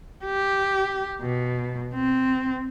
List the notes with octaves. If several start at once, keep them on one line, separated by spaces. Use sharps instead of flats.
G4
B2
C4